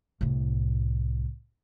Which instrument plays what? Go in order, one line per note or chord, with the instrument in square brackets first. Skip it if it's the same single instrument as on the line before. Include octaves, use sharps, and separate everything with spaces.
[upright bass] C2 A2